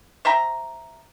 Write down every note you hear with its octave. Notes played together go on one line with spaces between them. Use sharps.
C5 E5 G5 A#5